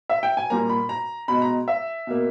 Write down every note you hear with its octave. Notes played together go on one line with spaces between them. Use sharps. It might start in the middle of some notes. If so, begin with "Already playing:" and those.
E5
G5
G#5
A#2 G3 A#3 A#5
B5
A#5
B2 G#3 B5
A#5
E5
B2 A#3